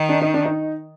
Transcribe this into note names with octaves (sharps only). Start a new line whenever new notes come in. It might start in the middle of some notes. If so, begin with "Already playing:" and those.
Already playing: D#3
D4
D#4
D4
D#4